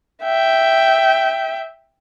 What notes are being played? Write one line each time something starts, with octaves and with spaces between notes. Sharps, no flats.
E5 G5